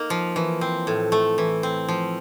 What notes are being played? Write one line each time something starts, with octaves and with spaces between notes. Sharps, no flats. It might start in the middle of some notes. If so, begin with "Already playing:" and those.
Already playing: A#3 D#4
F3
E3
C4
A2
A3
E3
C4
F3